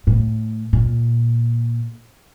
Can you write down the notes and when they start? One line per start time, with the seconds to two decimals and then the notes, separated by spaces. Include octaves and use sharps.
0.07 A2
0.73 A#2